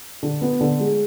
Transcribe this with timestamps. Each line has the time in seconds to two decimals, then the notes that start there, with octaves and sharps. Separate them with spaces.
0.23 D3
0.42 B3
0.60 D3
0.80 G#3